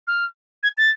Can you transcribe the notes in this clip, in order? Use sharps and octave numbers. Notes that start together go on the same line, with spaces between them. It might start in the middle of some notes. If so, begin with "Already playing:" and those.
F6
G#6
A6